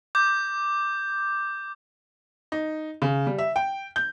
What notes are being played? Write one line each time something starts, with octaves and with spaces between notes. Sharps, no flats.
D6 G6
D#4
C#3
G3
E5
G5
G6